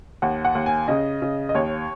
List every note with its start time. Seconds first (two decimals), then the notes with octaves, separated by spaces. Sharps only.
0.22 D#2 F#5
0.45 F#5
0.55 D#2
0.66 G#5
0.88 C#3 D#5
1.22 C#3
1.49 D#5
1.55 D#2 C#5